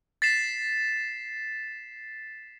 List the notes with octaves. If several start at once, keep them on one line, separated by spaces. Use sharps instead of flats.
A6 B6 C7 E7